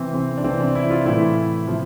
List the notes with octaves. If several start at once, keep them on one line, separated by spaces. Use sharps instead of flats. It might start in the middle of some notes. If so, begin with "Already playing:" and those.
Already playing: C3 E3 C4
C4
D4
C3 E3 C4
D4
E4
F4
A2 E3 E4
C3 F3